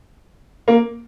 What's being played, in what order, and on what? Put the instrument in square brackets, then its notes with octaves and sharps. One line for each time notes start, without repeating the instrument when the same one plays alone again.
[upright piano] A#3